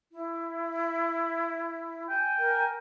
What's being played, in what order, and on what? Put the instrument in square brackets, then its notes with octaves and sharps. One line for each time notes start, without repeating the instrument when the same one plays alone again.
[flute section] E4
[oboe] G5 [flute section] G#5
[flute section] A#4 G#5